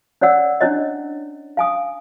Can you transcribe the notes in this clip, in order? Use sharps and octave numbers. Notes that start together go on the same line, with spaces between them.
C#4 C#5 D5 F#5 E6
C#4 D4 E4 C#5 D#5
F5 G#5 D#6